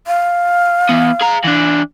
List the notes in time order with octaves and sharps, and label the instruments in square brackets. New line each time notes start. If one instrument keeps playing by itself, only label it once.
[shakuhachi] F5
[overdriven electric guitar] E3 B3
G#4 A#5
E3 D4